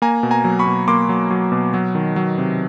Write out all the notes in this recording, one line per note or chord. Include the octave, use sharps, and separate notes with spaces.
A#3 G#5 A#5
B2
G#5 A#5
F#3
B5 C#6
B2
A#3 C6 D6
F#3
F#3
B2
F#3
D#3
F#3
C3